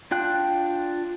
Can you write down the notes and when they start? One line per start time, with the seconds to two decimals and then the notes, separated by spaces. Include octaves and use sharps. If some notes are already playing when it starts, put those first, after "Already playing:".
0.11 D4 F4 G5 F#6